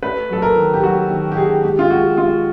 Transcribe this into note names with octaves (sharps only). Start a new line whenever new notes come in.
A3 B4
F#3 A4
A#4
D#3
G4
F#3 F#4
D#3
G4
D#3 G#4
G#3 G4
F4
G#3 F#4
G#3 F4